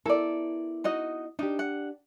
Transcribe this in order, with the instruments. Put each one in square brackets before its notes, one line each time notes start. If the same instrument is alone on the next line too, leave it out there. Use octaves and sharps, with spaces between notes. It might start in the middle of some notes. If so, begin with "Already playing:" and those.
[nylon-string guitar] B3 E4 A#4 [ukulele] A4 D5
[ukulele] D#4 F#4 D#5
[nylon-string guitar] D4 G4 [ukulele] D#4
[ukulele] F#5